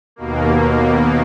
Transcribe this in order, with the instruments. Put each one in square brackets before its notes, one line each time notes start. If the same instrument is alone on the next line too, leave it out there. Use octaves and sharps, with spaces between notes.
[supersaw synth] D#2 B2 A#3